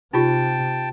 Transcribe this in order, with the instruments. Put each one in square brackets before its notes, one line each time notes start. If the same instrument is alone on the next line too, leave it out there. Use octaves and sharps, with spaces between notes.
[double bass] C3 [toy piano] D#4 F4 G4 [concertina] G5 A5